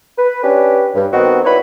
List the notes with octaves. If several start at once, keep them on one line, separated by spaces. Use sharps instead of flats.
B4
C#4 D4 G4 B4
G2
D#3 B3 C4 D#4 F#4
E4 B4 C#5 D5 B5